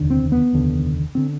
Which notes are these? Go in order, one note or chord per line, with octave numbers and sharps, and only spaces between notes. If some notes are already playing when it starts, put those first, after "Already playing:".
Already playing: F1 D#2 D3
C4
B3
F1 D#2 D3
D3 C4